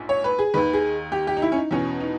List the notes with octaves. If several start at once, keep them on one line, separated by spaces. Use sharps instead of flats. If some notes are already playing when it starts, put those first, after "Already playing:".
Already playing: A#1 G#2
C#5
B4
G#4
D#2 D#3 B4
G#4
G4
G4
D#4
E4
C#4
D#4
E2 B2 C#4
D#4